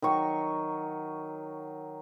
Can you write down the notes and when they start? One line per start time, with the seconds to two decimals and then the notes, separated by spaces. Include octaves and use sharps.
0.02 D#3 F#3 C#6